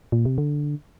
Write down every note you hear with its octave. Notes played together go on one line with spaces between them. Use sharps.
A#2
C3
D3